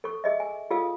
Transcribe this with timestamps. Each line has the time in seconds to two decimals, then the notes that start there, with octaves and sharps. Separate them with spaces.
0.04 A4 C#6
0.24 G#4 D#5 E5
0.40 G#5
0.71 F4 G#4 A4 F5 D#6